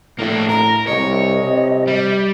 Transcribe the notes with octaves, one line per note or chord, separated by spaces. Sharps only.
A2 A#3 D4
A#4 A#5
C2 C#5 D#5
C3
G3